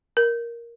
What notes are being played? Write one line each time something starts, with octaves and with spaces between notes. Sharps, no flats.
A#4